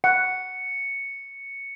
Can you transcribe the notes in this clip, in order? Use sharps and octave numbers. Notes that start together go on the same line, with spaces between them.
F#5 C#7